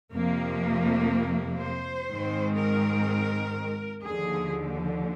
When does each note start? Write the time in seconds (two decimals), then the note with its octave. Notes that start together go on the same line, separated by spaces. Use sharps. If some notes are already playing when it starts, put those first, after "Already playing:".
0.12 F2 C3 F3 A#3
1.59 C5
2.09 G#2 D#3 G#3 C4
2.57 A#4
4.05 D#2 D3 F3 G#4